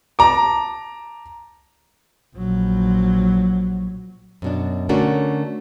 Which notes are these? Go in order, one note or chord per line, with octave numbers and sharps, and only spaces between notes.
A5 A#5 D6
A#1 F#3
F#2 B2 D4
D3 A3 C#4 D4 F#4 A#4